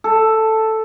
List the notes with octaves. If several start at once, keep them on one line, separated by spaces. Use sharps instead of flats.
A4